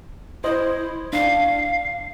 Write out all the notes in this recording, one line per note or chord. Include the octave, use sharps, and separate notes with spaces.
E4 C5 D#5
D4 F5